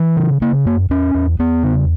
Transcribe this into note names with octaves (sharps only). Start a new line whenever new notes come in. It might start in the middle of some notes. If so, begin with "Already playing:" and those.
Already playing: E3
C#3
C#3 A#3
F#2 A#3
E2 C#4
E2
E2 B3
C#3